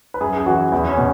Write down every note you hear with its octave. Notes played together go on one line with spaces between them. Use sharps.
B4
F#2 G#4
G#4
E3 F#4
E2 E4
C#4
B2